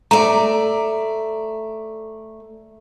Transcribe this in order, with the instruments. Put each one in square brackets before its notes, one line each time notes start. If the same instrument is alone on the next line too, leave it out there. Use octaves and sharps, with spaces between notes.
[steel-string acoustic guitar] A3 D5 [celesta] A#5